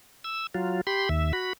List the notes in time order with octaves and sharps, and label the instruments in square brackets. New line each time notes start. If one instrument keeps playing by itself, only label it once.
[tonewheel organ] E6
F#3 F4
G4 B5 C6
D#2 E5
F#4 B5